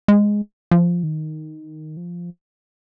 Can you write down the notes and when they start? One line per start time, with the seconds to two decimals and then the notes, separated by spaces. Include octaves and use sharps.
0.08 G#3
0.71 F3
1.03 D#3
1.97 F3